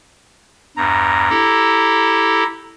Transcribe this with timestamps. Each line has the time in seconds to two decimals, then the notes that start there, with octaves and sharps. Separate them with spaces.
0.77 E2 G2 A#5
1.30 E4 G4 A4